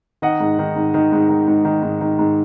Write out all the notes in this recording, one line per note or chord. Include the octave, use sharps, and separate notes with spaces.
D#3 D#5 F#5
G#2
D#3
G#2
D#3
G#2
D#3
G#2
D#3
G#2
D#3
G#2